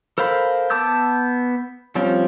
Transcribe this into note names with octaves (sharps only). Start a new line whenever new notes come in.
A4 A#4 C5 F5 B5
B3 A5 D6 E6 G6
F3 G3 C4 C#4 F4